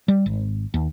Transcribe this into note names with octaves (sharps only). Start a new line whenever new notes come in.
G3
G#1
D#2